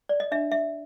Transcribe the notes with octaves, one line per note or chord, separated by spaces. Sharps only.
D5
D#5
D4 E5
E5